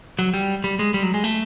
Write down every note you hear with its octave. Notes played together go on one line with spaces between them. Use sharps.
F#3
G3
G3
G#3
G3
F#3
G#3
A3